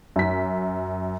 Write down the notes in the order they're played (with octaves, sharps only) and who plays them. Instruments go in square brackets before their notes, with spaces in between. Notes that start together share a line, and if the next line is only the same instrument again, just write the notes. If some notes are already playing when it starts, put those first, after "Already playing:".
[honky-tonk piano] F#2 B6